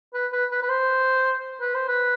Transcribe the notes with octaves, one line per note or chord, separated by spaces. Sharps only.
B4
B4
B4
B4
C5
B4
C5
B4